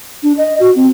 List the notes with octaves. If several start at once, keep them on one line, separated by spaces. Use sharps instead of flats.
D4
D#5
F#4
C4